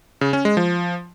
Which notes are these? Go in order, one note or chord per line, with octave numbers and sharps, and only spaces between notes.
C#3
C#4
G#3
F3